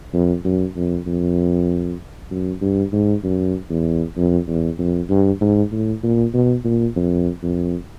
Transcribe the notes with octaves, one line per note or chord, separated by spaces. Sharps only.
F2
F#2
F2
F2
F#2
G2
G#2
F#2
E2
F2
E2
F2
G2
G#2
A2
A#2
B2
A#2
F2
F2